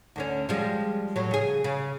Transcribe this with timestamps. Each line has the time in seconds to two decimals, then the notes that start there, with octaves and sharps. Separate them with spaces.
0.16 D2 D3 C#4
0.49 F3 G3 G#3
1.16 A2 F#3
1.31 C#3 G#4
1.64 C#3